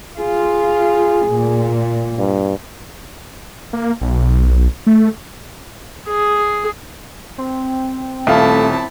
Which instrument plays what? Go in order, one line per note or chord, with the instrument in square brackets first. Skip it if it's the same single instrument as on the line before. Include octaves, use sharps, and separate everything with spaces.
[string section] F4 [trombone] G#4
[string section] A#2
[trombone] G2
[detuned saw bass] A#3
B1
A3
[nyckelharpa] G#4
[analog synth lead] C4
[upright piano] D#1 F5 [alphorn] A3 [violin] E4 A5